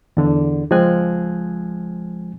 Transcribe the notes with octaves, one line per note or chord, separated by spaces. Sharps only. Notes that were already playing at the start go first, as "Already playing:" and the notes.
E2 D3
C#2 F3 G#3 C4 G#5 F#6